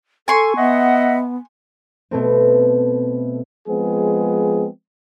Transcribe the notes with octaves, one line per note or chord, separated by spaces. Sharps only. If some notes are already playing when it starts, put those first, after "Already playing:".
A4 G#5 C6 C#6
B3 D#5 E5 F#5
B2 A3 C4
F3 G#3 B3 C4 G#4